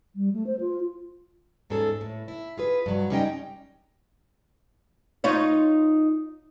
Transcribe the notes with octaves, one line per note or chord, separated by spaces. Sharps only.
G3
A3
C5
F4
E2 G#2 C#4 G#4 A4
A2
E4
F4 G#4 B4
G2 F#3
G3 G#3 C#4 D#4 D#5 G5
D#4 F4 C#5